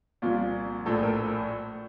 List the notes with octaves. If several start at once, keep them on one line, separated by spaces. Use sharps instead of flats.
C2 A#2 F3 F4
A#1 A2 F3 A4
A#4
A4